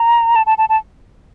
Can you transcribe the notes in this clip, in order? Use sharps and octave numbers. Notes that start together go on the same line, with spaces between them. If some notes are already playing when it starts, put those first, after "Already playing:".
Already playing: A#5
A5
A5
A5
A5